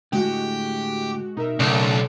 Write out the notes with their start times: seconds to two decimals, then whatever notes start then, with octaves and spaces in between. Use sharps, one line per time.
0.13 A2 D3 G#3 F#4 G4 F#5
1.37 B2 D#4 A#4 E5
1.60 B1 A2 C#3 D4